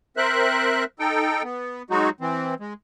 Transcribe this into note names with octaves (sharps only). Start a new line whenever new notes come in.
C4 A#4 C5 E5 F#6
D#4 A4 G5
B3
F#3 G#3 D#4 F#4
E3 C4
G#3